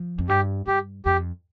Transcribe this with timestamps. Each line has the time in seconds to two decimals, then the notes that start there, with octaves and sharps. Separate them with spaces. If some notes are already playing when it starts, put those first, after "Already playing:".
Already playing: F3
0.19 F2
0.29 G2 G4
0.67 G2 G4
1.05 F2 G4